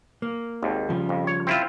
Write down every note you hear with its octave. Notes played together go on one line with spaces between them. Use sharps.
A#3
G#1 D#2
C#3 F3 G3
F2
C#5
C4 E4 F4